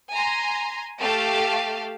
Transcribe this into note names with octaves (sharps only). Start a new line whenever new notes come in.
G#5 A#5 C6
A3 G4 F5 A5